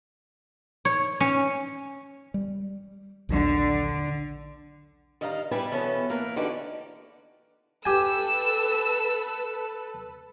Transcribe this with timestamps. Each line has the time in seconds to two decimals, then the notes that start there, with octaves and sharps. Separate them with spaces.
0.85 C#5
1.20 C#4
2.34 G3
3.29 A#1 D#2 D3 F#3
5.21 D#3 G3 D#5 F5 F#5 A#5
5.51 D2 G3 E4 B4 G5 G#5
5.71 B2 E3 B3 C#4 A4
6.09 E3 A#3 A#4 B4
6.36 D3 E3 D#4 F#4 G4 D5
7.85 G4 A4 B4 G#5 E6